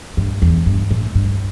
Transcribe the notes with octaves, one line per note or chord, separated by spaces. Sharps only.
G2
E2
G2
A2
G2